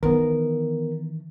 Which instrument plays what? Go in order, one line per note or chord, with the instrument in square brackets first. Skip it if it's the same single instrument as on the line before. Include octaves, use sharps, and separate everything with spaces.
[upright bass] D#3 E3 [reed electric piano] B3 A#4